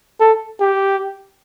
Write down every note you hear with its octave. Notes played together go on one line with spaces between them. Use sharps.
A4
G4